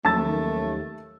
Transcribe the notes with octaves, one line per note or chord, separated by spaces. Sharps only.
D#2 F3 F#3 A3 C#4 A5 E6 A6